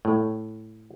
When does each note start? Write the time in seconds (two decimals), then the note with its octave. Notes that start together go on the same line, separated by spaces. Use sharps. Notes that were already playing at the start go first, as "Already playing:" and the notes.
0.05 A2